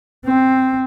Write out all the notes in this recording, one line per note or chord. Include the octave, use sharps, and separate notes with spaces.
C4